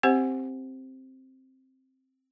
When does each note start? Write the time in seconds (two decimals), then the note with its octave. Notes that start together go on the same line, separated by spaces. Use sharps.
0.03 C4 G4 C5 F#5